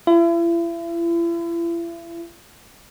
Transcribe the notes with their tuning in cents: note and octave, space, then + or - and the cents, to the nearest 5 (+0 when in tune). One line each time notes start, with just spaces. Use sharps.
E4 +40